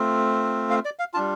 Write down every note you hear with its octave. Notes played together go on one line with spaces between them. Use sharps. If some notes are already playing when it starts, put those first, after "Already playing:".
Already playing: A3 C4 F4
F5
D5
F5
G3 D4 F4 A5